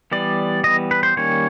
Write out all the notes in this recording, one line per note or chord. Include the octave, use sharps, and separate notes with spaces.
E3 G3 B3 D5
E3 G3 B3 D#5
B4
C5
D#3 G3 A#3 C#4 C#5